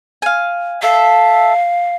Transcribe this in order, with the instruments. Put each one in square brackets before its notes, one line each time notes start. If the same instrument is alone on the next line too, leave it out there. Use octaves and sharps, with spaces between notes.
[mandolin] F5 G#5
[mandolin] A4 E5 [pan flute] F5